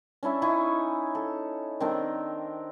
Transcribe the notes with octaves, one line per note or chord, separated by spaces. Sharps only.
C#4 D4 E4 E5
D#4 E4 G#5 C#6
A4
D#3 C4 D4 A#4